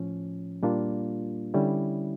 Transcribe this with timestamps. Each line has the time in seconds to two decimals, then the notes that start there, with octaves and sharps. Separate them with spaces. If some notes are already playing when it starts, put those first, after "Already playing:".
Already playing: A2 F3 C#4
0.63 A#2 G3 A#3 D4 F4
1.54 D3 G3 C#4 E4